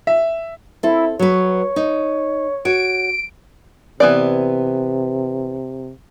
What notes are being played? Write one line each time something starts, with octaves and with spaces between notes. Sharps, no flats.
E5
C4 E4 A4
F#3 B4 C#5
D#4
F#4 C#5 D7
C3 E3 B3 D5